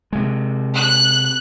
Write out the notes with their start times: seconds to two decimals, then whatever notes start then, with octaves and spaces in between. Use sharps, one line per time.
0.13 C3 G#3
0.75 F#6